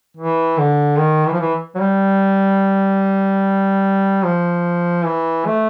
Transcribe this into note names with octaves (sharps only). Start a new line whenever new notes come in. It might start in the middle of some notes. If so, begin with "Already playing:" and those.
E3
D3
D#3
E3
F3
E3
F#3
G3
F3
E3
A3